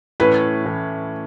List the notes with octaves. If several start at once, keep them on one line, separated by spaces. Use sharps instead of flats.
A2 E3 C#4 B4
A2 E3 C#4